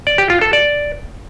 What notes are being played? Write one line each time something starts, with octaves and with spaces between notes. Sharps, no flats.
D5
G4
F4
A4
D5